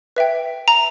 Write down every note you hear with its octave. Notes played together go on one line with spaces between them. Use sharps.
B4 E5 G5
A#5